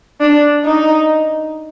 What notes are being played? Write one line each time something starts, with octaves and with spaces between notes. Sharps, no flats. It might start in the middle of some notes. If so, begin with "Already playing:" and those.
D4
D#4